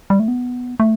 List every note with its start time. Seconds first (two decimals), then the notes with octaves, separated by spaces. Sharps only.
0.10 G3
0.20 A3
0.28 B3
0.80 A3